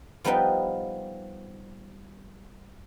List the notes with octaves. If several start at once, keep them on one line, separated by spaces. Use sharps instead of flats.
F3 G3 B3 D#4 B4 G5